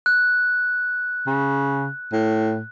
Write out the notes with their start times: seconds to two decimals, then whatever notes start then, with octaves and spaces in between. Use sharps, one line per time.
0.06 F#6
1.27 C#3
2.13 A2